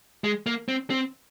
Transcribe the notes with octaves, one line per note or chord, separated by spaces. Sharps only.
G#3
A#3
C4
C4